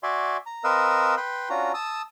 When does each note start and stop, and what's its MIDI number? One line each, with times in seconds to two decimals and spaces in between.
0.03 0.37 66
0.03 0.37 74
0.03 0.37 76
0.03 0.37 80
0.03 0.37 84
0.46 0.64 82
0.64 1.15 60
0.64 1.15 70
0.64 1.15 71
0.64 1.15 75
0.64 1.15 77
0.64 1.15 88
1.17 1.49 71
1.17 1.49 79
1.17 1.49 83
1.17 1.49 84
1.50 1.72 61
1.50 1.72 62
1.50 1.72 65
1.50 1.72 66
1.50 1.72 82
1.74 2.02 81
1.74 2.02 87
1.74 2.02 88